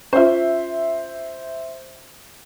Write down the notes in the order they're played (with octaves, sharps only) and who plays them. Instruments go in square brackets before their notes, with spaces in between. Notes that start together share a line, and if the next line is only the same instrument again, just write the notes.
[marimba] C#4 F4 [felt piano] C5 E5